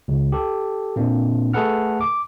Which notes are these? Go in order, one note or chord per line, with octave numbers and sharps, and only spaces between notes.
C#2
G4 A4
A#2 A#3 C4 D4
A3 G#4 A4 B4 F#5 F6
D6